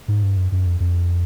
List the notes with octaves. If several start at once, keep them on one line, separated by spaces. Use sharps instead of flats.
G#2
G2
F#2
F#2
F2
F2